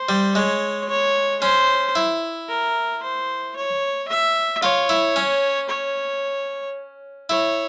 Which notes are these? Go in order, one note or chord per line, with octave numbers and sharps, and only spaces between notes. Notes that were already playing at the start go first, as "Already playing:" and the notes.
Already playing: C5
G3
G#3 C#5
C#5
C#4 C5
E4
A#4
C5
C#5
E5
F4 C#5
E4
C#4
C#5
E4 C#5